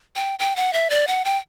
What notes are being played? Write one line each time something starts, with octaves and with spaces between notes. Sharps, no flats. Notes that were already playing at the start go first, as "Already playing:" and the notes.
G5
G5
F#5
E5
D5
F#5
G5